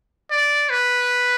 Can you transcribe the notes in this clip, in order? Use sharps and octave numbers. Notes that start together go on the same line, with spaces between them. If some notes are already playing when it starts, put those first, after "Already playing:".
D5
B4